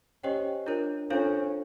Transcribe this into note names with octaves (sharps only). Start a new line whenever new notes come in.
C#4 G4 C5 D#5 G5
D4 F4 A#4 C#5
C#4 D4 F4 A4 C5 F5